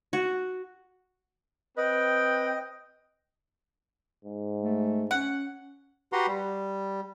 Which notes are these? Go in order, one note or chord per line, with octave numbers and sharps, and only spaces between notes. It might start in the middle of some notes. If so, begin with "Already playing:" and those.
F#4
C4 B4 D#5 G5
G#2
A3
C#4 F#5
F#4 G4 B4 F#5 A#5 C6
G3